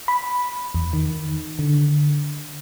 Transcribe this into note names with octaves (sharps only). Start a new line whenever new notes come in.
B5
E2
D#3
D3